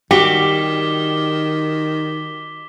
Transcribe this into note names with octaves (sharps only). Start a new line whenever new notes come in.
D#3 G3 F#4 G4 D6 B6 G7